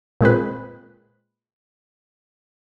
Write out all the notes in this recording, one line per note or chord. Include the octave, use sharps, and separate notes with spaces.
A#2 G#3 C4 B4